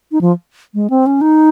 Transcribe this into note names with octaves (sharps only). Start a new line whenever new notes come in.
D#4
F3
G#3
C4
C#4
D#4